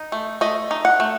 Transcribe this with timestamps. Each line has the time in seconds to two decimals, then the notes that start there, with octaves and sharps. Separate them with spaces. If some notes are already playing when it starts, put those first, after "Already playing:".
Already playing: D#4
0.12 A3
0.41 A3 D#5
0.71 D#4
0.85 F#5
1.00 A3